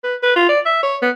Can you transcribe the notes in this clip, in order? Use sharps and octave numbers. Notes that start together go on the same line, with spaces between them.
B4
B4
F4
D5
E5
C#5
B3